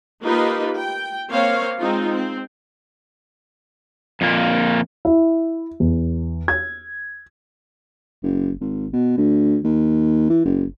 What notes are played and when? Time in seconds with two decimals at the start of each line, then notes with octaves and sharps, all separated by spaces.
0.22 A#3 D#4 F4 G4 B4 D#5
0.74 G5
1.30 A#3 C4 C#5 F5
1.78 G#3 C4 D#4 F4
2.10 C4
4.21 F2 A#2 A#3
5.05 E4
5.80 E2
6.48 G#6
8.23 F#1
8.61 G#1
8.93 B2
9.18 D2
9.65 D#2
10.30 E3
10.45 F#1